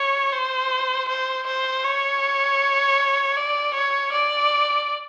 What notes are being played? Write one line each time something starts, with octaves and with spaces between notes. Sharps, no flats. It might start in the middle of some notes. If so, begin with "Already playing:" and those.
Already playing: C#5
C5
C5
C5
C#5
D5
C#5
D5